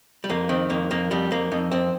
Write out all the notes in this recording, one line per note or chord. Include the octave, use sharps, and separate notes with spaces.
G3
F2 A#3
D#3 C4
F2 A#3
F2 A#3
F2 G3
F2 A#3
F2 D#4
F2 C4